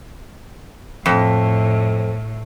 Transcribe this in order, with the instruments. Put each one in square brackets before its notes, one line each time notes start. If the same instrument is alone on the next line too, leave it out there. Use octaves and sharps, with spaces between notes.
[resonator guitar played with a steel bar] F2 [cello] A2